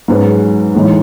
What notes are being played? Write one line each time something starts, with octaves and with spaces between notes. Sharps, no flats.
G#2 F#3 C#4 G#4 B4
A2 E3 G#3 D#4